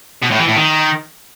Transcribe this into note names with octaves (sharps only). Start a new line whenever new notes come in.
B2
A2
E3
A2
D#3